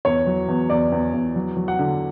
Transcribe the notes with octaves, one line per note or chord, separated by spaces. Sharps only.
E2 C#5
F#3
E2
E2 D5
E2
E2
F#3
F#3
F#5
D3